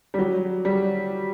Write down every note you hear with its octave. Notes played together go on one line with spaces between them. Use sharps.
G3
F#3
G3